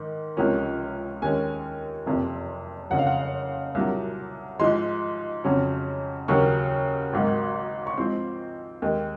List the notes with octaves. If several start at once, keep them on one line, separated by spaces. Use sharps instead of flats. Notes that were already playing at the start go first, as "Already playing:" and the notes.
Already playing: G#2 D#3
C#2 C3 F3 A#3 C#4
D#2 D#3 G#3 C#4 G#5
F#1 F2 C3
F#1 F2 C#3 F#5
F5
F#5
C2 A#2 F#3
G#2 F3 G#3 C6
F2 C#3 F#3 C#4
D#2 C#3 F#3 A#3 C#6
G#1 G#2 F#3 A#3
C#6
G#2 F3 C4 C6
D#2 D#3 G#3